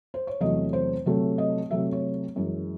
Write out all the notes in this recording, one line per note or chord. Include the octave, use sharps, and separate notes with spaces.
C5
C#5
E2 C3 F#3 A3 D#5
C5
C3 F#3 A3
D#5
C3 F#3 A3 E5
C#5
F#2 E3 G#3